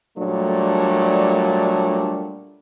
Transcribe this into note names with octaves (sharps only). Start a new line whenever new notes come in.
A#2 F#3 G3 A3 D4